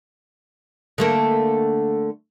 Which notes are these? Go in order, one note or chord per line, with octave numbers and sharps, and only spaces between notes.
D3 A3 A#3